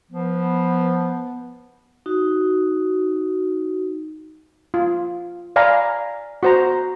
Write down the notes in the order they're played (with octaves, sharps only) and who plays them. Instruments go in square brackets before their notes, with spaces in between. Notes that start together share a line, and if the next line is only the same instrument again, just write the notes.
[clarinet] F3 [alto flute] B3
[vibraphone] D#4 F#4
[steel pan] F4
D5 F5 G#5 A#5 B5
F#4 C5 A#5